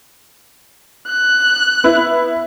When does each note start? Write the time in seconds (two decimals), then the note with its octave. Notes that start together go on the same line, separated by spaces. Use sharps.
1.08 F#6
1.84 B3 E4